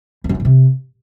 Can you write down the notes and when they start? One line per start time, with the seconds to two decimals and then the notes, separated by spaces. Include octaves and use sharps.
0.24 F2
0.29 F#2
0.35 D#3
0.40 A#2
0.45 C3